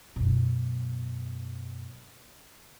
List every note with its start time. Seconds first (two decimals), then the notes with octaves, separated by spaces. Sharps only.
0.16 F#2 B2